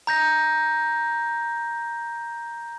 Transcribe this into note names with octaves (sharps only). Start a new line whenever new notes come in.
A#5 G6 A#6